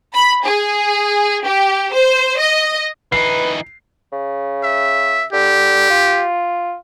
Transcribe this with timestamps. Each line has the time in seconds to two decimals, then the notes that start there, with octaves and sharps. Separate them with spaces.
0.14 B5
0.45 G#4
1.45 G4
1.93 C5
2.40 D#5
3.12 E3 D#4 B4 C7
4.12 C#3
4.63 E5
5.33 D3 G4
5.90 F4